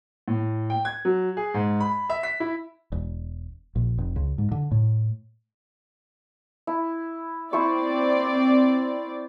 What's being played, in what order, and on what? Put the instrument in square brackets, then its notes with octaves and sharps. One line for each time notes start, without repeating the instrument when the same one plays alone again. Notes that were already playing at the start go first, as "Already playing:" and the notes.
[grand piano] A2
G5
G#6
F#3
G#4
G#2
B5
E5
B6
E4
[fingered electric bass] E1
A#1
F1
C#2
G#2
D3
A2
[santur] E4
[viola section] C4 D5 [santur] E4 C5 C#6